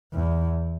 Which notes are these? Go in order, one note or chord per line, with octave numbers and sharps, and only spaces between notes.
E2